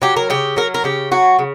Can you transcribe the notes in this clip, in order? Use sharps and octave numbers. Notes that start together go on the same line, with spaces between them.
F#3 G4
A#4
C#3 G4
F#3 A#4
A#4
C#3 G4
F#3 F#4
C#3